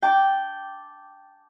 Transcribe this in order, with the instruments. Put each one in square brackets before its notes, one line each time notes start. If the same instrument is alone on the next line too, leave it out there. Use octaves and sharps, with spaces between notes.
[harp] G5 A5 D6